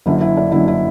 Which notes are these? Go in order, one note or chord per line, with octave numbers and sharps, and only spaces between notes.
F#1 F#2 D3 E4
E4
D4
F#1 F#2 D3 E4
E4